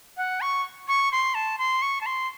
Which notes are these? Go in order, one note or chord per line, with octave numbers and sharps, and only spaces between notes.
F#5
C#6
C#6
C6
A5
C6
C#6
A5
C6